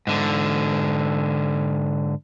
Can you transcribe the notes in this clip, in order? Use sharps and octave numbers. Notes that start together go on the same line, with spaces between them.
G#2 D3